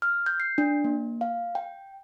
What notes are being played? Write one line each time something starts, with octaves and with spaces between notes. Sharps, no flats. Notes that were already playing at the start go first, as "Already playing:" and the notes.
F6
G6
C7
D4
A#3
F5
G5